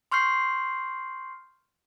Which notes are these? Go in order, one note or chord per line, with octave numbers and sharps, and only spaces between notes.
C6 C#6 F6 G6 C7